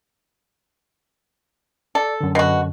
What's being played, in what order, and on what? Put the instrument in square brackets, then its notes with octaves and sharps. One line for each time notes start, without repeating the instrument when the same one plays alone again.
[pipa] A4 [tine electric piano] D5
[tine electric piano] F#2 D3
[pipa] B2 F#4